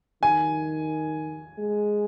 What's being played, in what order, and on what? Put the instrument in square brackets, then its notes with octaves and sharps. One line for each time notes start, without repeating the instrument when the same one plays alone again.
[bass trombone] D#3 [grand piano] G#5
[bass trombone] G#3